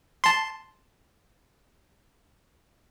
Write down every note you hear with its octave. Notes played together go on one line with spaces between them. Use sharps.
A5 C6